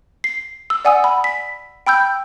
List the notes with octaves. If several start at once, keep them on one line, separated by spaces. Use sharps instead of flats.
C7
E6
D5 F#5 G#5 D#6 E6
B5
B6
G5 B5 E6 G6